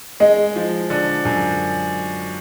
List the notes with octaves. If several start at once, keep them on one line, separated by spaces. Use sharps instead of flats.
G#3 D#5
F3
D3
F#2